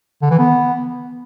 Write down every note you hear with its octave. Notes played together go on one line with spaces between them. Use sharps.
D3
E3
B3